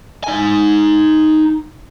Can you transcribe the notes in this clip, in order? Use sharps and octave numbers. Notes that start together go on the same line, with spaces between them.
D#4 G#5